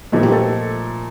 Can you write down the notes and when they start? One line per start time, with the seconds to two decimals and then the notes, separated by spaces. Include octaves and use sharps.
0.12 A#2 F3 A3 D#4 A4
0.23 G4
0.32 A4